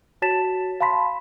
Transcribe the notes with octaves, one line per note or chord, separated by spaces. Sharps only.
F#4 C#5 A5 A6 B6 E7
F5 A5 B5 C6 B6